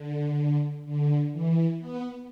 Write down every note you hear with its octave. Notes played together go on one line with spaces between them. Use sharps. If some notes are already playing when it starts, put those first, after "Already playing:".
Already playing: D3
D3
E3
B3